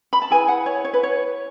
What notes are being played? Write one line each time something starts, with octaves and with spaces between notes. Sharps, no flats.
B5
A5
E4 G#4 B4 G#5
F#5
C#5
C#5
B4
C#5